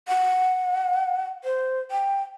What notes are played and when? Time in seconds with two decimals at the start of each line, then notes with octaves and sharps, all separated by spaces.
0.08 F#5
1.44 C5
1.91 G5